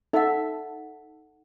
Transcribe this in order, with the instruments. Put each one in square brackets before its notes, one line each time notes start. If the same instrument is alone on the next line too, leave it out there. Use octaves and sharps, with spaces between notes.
[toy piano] D#4 F#5 [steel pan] A4 E5 A5